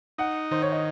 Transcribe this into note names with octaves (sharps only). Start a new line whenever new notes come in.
D#4 F#5
D#3 C5
C#5
D#5